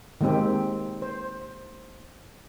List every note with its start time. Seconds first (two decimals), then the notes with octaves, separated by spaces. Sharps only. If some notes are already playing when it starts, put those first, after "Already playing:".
0.21 D#3 G#3 A#3 C4 G4
1.02 C5